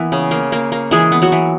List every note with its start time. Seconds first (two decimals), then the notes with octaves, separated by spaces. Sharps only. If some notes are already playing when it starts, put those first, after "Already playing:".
Already playing: E3 A#3 B3
0.12 C#3
0.31 A#3
0.52 A#3
0.72 A#3
0.91 E3 G#3 G#4
1.12 B3
1.22 F#3 F#4
1.32 E3